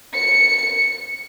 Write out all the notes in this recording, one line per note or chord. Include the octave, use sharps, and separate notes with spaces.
C#7